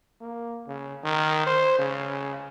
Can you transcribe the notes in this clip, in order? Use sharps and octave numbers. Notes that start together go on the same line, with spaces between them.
A#3
C#3
D#3
C5
C#3